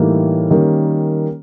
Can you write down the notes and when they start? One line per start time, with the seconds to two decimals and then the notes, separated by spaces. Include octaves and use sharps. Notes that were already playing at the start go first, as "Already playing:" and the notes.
Already playing: A2 E3 G3 A#3 D#4
0.50 D#3 G3 A#3 C#4